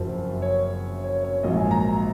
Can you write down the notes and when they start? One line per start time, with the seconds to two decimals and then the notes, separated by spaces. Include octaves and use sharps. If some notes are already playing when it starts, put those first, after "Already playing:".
Already playing: F#1 F#2 F3 C5
0.42 C#5
1.04 C#5
1.24 C#5
1.43 A#1 G#2 F#3 A#3 D#5
1.57 G#5
1.71 A#5